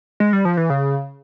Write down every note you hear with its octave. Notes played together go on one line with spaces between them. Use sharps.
G#3
G3
F3
E3
C#3